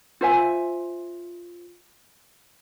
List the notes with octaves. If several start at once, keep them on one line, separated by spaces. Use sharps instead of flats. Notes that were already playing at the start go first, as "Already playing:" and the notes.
F4 C5 E5 G#5